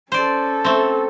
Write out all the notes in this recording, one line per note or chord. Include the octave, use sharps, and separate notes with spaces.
C#4 A4 C5 D5
A3 C4